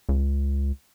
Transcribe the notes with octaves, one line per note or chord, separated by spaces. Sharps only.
C#2